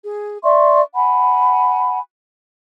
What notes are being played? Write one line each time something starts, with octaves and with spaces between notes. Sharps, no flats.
G#4
D5 E5 C6 C#6
F#5 G#5 B5